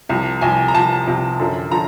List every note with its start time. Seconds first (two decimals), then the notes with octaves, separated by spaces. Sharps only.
0.09 C2 C3 F3
0.41 C2 C3 F3 G#5
0.68 A#5
0.74 C2 C3 F3 A5
1.07 C2 C3 F3
1.39 F#2 D3 F3
1.71 D3 F3 A#5